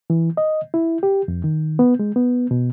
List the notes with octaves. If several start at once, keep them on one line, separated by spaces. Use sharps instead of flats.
E3
D#5
E4
G4
F2
D#3
B3
G#3
B3
B2